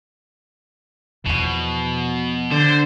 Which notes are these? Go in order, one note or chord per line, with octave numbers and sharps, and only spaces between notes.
E2 B2 F3
D3 C5